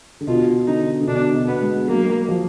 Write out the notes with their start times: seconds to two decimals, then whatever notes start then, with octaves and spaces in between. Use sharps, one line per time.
0.21 D3
0.27 B2 F4
0.67 D3 D#4
1.00 D3
1.08 B2 D4
1.35 B2
1.48 B3
1.62 G#3
1.88 F#3 A#3
2.29 F3